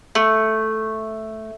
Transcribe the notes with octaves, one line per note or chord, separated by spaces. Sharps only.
A3